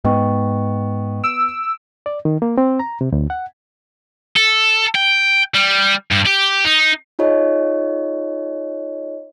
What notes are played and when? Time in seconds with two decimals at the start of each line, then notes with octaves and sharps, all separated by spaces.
0.05 G#2 B3 D#5 G5 C#6
1.24 E6 D7
2.06 D5
2.25 D#3
2.42 A#3
2.58 C4
2.80 A#5
3.01 C3
3.12 D2
3.30 F#5
4.37 A4
4.95 G5
5.55 G3
6.11 G2
6.26 G4
6.65 D#4
7.19 D#4 F4 G#4 C#5 D#5